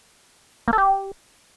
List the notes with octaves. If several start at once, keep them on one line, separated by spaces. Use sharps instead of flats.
A#3
A4
G4